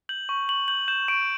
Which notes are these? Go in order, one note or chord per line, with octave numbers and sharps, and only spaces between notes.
G6 F#7
C#6
C#6 F#7
G6 F#7
G6 E7
C#6 D7